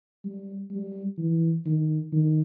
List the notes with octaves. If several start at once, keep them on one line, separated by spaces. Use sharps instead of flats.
G3
G3
E3
D#3
D#3